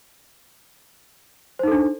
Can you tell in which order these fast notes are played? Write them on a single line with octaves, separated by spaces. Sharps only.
C5 D#4 A4 D4